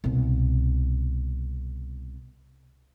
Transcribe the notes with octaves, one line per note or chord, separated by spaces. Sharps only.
C2 B2